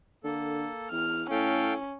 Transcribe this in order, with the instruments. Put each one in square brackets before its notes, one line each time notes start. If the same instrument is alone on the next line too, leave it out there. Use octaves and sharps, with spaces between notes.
[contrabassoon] D3 [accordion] A#3 A4
[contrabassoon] E2 [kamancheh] F6
[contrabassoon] A2 [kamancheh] C#4 [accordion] A4 F5 G5